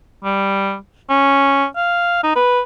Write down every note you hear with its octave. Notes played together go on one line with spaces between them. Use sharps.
G3
C#4
F5
D#4
B4